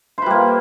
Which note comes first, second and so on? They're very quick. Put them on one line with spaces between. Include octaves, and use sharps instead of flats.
C5 B4 G3 A#3